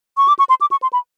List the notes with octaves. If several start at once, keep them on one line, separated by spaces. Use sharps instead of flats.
C#6
D6
C#6
C6
D6
C#6
C6
B5